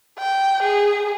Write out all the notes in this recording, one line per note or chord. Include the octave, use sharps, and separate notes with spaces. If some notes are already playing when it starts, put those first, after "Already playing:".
G5
G#4